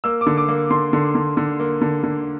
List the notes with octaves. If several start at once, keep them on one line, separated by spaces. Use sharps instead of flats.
A#3 E6
D6
D3
D6
A#3
D3 C6
D3
D3
D3
A#3
D3
D3